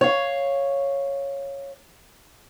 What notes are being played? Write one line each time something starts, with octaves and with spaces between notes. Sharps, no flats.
C#5 F5